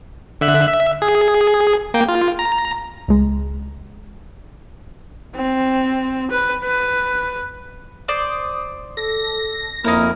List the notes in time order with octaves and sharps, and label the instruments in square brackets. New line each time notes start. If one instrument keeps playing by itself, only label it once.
[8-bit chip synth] D3 E5 F#6
E5
G#4
A#3 G5
F4
A#5
[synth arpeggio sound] C#2 G#3
[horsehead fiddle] C4
B4
B4
[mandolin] C5 D5 [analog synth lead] D#6
[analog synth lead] A4 [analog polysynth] A#6
[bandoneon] F2 E4 A#4 [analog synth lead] A#3 [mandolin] D#4 C#5 F6